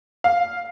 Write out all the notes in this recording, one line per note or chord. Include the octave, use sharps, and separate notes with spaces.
F5